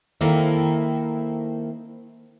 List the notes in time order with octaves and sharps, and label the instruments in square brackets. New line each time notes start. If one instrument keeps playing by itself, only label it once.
[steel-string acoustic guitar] D#3 A#3 C4 E4 A4